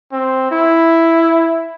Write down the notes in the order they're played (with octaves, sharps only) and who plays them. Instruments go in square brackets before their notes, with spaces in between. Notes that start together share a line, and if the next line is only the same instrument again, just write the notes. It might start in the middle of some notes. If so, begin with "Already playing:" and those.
[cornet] C4
E4